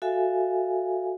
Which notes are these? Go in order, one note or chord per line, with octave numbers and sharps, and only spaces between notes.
F#4 A4 E5 F5 G#5